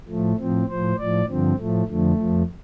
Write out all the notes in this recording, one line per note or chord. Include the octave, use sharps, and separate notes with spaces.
A2 F3 A3
A2 F3 C4
A2 F3 C5
A2 F3 D5
G2 D3 F3 C4
A2 F3 A3
F2 D3 F3 A3
F2 F3